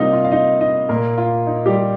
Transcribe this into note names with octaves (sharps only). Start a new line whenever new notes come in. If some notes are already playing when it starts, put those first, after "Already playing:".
Already playing: C3 G3 A#3 D#4 F4 D#5 F5
F4
F5
D#4 D#5
D#4 D#5
A#2 A#3 A#4
F4
D#4
G3 G4